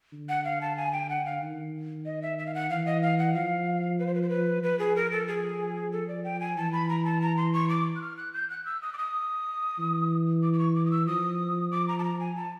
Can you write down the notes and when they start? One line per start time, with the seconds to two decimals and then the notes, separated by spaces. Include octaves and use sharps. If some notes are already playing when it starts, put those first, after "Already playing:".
0.13 D3
0.29 F#5
0.44 F5
0.61 A5
0.77 G#5
0.93 G5
1.09 F#5
1.26 F5
1.42 D#3
2.05 D#5
2.22 E5
2.38 E5
2.46 F5
2.54 F#5
2.70 E3 F5
2.86 D#5
3.02 F5
3.19 F#5
3.34 F3 F5
3.99 B4
4.07 C5
4.14 B4
4.22 C5
4.29 B4
4.63 F3 B4
4.79 G#4
4.96 A#4
5.11 A4
5.28 G#4
5.92 A4
6.08 D5
6.24 G5
6.40 G#5
6.56 E3 A5
6.72 B5
6.89 A#5
7.05 A5
7.21 A#5
7.37 C6
7.53 C#6
7.69 D6
7.96 F#6
8.01 F6
8.17 F#6
8.33 G6
8.50 F#6
8.65 E6
8.82 D#6
8.93 D6
8.98 D#6
9.79 E3
10.42 D6
10.53 D6
10.59 C#6
10.75 D6
10.86 D#6
10.91 E6
11.07 F3 D#6
11.71 D6
11.88 A#5
11.99 A5
12.04 A#5
12.20 G#5
12.36 A5